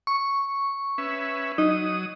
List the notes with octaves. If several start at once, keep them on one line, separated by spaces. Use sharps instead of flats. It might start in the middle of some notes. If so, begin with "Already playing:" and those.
C#6
C#4 B4 E5
F#3 D#4 D#6